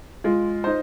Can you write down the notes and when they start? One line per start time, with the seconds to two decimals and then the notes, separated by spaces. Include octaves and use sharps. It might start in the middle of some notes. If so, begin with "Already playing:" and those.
0.24 G#3 F4
0.64 D#4 C5